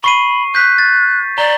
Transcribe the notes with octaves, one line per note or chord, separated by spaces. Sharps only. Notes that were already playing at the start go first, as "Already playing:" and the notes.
B5 C#6 C7 D#7
F#6 G6 B6
A6
D5 A#5 G7